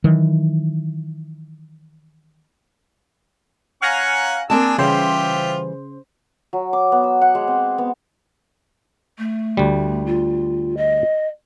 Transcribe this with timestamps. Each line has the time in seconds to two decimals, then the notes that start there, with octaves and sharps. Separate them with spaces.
0.04 D#3 E3 F#3
3.82 C#4 F5 F#5 G#5 A#5 C#6
4.50 A#3 C4 D4 G#4 A5 E6
4.78 C#3 E3 G3 F4 G4 C5 E5
6.53 F#3
6.73 D6
6.92 B3
7.04 E6
7.22 F#5
7.35 G#3
7.48 C4
7.78 B3
9.18 A3
9.57 D2 G3
10.06 F4
10.77 D#5